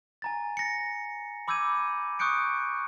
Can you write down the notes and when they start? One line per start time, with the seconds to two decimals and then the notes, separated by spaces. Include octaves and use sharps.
0.22 G#5 A#5 A6
0.57 A6 A#6 C#7
1.48 B5 D6 E6 G6 G#6 D#7
2.19 C#6 D#6 F#6 G6 C#7 D7